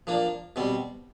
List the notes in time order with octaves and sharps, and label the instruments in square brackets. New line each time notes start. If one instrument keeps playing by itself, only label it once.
[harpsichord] F3 A#3 D4
B2 G3 C4